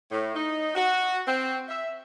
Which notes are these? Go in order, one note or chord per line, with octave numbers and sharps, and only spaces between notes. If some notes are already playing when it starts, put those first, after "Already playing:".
A2
D#4
F#4
C4
E5